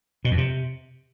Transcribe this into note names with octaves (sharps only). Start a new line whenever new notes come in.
B2
F2
C3